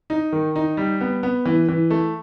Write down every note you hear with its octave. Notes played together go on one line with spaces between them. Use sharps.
D#4
D#3
D#4
G3
B3
B3
E3
E3
A3